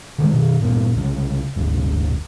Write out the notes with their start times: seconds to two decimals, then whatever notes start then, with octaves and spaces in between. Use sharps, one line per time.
0.18 D3 D#3 F#3 G#3
0.34 B2 D#3
0.61 G#1 G2 A#2 B3
0.95 C2 C#3
1.56 F#1 D2 G#2